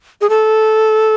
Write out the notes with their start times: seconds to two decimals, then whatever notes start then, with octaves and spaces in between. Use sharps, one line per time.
0.21 G#4
0.29 A4